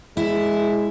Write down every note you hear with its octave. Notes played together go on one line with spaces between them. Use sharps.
G#3 E4